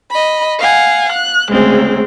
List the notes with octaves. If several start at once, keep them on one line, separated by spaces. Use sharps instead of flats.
D#5 B5
F5 F#5 G#5
F#6
D2 C#3 G#3 C4